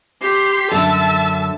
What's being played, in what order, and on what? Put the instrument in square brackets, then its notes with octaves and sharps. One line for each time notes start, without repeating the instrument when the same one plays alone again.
[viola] G4 [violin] C6 B6
[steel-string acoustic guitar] F#2 D3 [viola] E5 [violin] A5